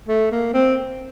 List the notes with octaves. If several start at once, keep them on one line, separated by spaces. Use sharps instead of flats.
A3
A#3
C4